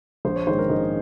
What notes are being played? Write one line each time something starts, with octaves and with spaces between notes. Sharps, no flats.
A#1 C5
C#5
G#2 D#3 G#3 C#4 C5
A#4
A#1 D#4